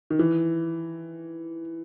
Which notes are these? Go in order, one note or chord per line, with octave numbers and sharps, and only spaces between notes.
D#3
E3